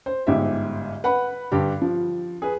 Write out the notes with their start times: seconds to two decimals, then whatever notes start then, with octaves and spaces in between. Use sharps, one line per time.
0.06 C5
0.27 G1 G#2 G4 E5
1.04 B4 F#5 B5
1.52 G2 D3 G4
1.82 F3
2.42 G#4 B4